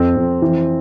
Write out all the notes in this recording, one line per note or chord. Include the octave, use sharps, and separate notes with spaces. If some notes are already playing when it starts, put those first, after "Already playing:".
Already playing: F2 C4
F2
E3